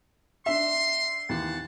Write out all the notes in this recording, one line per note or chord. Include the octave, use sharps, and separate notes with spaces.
D4 E5 C6
D#2 E3 F#5 A5